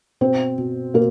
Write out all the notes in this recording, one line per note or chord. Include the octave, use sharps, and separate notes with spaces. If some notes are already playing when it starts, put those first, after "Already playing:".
B2 C4 C5
B2
B2 A#3 A#4